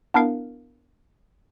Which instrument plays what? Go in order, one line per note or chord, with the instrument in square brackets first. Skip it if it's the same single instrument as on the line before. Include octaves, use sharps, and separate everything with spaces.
[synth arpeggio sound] B3 D4 E4 A#4 F5